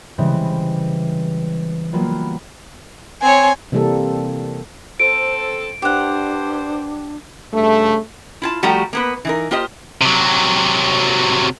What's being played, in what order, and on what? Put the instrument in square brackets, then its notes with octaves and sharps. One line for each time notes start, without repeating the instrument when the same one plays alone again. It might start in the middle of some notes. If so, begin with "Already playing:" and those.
[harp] C#3 E3 G3 G#3 C4
F#3 G3 A#3 B3 F4
[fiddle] C4 C#5 [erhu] G#5
[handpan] C3 E3 G3 A#3 C4 A4
[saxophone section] C4 A4 [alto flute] C5 [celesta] D7
[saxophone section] G2 C5 [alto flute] D4 [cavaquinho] G4 F#5
[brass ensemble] G2 C#3 A3
[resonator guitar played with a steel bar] E4 F4 A5
F3 G3 A3 F#4 G4 A#5
A#3 B3 B4
E3 D#4 A#4
A#3 F4 G4 C5 D#5
[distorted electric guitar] C3 F#3